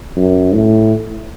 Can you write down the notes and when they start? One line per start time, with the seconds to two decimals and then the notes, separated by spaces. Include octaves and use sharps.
0.16 F#2
0.54 A2